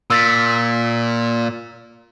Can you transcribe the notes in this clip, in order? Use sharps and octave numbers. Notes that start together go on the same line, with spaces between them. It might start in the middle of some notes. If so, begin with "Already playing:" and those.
A#2 E6 A6 B6